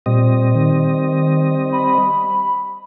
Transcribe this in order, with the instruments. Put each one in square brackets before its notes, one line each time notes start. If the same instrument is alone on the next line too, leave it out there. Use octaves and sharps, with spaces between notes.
[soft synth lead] A#2 [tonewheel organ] G3 C4 D#5
[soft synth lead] D#3
B5